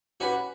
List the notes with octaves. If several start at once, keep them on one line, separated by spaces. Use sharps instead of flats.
F#3 C#4 F#4 G4 B4